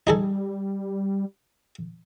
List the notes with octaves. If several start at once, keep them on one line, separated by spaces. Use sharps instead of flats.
G3 D#4 G#4 A4